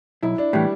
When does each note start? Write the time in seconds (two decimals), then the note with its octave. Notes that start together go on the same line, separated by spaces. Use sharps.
0.22 B1 E4
0.38 D4
0.53 A2 E3 G3